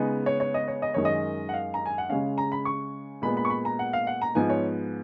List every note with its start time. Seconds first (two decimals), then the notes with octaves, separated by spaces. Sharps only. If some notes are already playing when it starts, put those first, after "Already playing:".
Already playing: C#3 G#3 B3 D#4
0.26 C#5
0.40 C#5
0.54 D#5
0.68 C#5
0.82 D#5
0.94 F#2 D#3 G#3 C#5
1.05 D#5
1.49 F#5
1.54 F5
1.74 A#5
1.86 G#5
1.98 F#5
2.09 C#3 G#3 C#4 F5
2.38 A#5
2.52 B5
2.65 C#6
3.22 A#2 G#3 B3 B5
3.37 B5
3.45 C#6
3.50 B5
3.65 A#5
3.79 F#5
3.93 F5
4.07 F#5
4.22 A#5
4.35 G#2 F3 B3 D#4 G#5
4.50 C#5